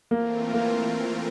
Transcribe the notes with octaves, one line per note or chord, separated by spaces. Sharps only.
E3 A3 A#3 C4 F4 A#4
A#3